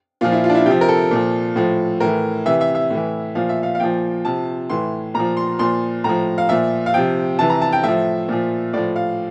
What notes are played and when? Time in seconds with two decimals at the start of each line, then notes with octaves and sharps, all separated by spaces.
0.21 A#2 F3 F4
0.32 E4
0.44 F4
0.49 D4
0.55 E4
0.66 C3 F3 G4
0.81 A#4
0.88 A4
1.11 A#2 F3
1.56 A2 F3
2.00 A2 E3 A#4
2.46 C3 E3 E5
2.61 E5
2.75 E5
2.90 A2 E3
3.35 A#2 F3 F5
3.49 E5
3.63 F5
3.75 F5
3.80 A#2 F3 G5
4.25 C3 F3 A5
4.70 A2 E3 C6
5.14 A#2 F3 A#5
5.37 C6
5.59 A#2 F3 C6
6.04 A2 F3 A#5
6.38 F5
6.49 A#2 F3 E5
6.86 F5
6.94 C3 F3 G5
7.39 C3 E3 A5
7.50 A#5
7.62 A5
7.73 G5
7.83 A2 F3 E5
8.29 A#2 F3
8.73 A2 F3 D5
8.96 F5